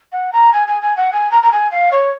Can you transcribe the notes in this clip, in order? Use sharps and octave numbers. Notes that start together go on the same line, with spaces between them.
F#5
A#5
G#5
G#5
G#5
F#5
G#5
A#5
A#5
G#5
F5
C#5